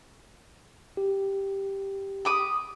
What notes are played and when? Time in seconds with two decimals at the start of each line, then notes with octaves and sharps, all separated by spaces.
0.97 G4
2.25 B5 D6 D#6